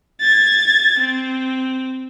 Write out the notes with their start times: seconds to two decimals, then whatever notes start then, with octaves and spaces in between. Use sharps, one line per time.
0.21 G#6 A6
0.99 C4